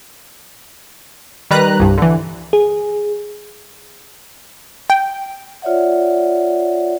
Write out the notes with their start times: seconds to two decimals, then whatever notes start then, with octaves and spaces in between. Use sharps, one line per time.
1.51 D#3 G3 B4 A#5 F#6
1.80 C2 G2
1.98 D3 E3
2.53 G#4
4.90 G5
5.62 F4 C#5 D5 E5 F#5